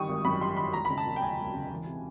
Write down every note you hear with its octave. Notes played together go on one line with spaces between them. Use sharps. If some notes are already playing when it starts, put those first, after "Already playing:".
Already playing: D#3 E3 G3 C#6 D#6
G#1
F#2 B5
G3 C6
D#3 B5
E1 A#5
C#3 B5
A5
E1
G5
D2 G#5
E1
C#3
E3
C3